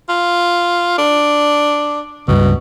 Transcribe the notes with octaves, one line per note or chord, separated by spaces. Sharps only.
F4
D4
C#2 G2 B2